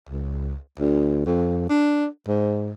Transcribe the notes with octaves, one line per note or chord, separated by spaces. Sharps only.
C#2
D2
F2
D4
G#2